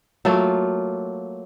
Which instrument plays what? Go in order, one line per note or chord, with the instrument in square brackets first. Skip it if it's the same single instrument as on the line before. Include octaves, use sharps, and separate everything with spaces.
[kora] F#3 A3 A#3 F4